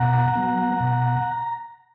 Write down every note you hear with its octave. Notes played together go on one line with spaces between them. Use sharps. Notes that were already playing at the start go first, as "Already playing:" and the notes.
Already playing: B2 F#5 A#5
F#3 B3
B2